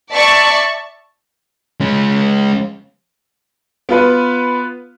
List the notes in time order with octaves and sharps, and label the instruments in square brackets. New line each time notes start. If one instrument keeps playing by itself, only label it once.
[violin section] D5 E5 A5 C#6
[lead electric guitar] G#3 C#4
[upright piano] B3 F4 B4